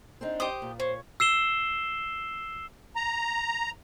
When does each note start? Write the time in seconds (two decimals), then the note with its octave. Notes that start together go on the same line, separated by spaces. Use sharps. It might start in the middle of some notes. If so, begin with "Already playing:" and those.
0.21 C4 D4 D#4
0.40 G4 C5 D#6
0.62 A#2
0.80 C5 C#5
1.20 E6 C7 E7 G7
2.96 A#5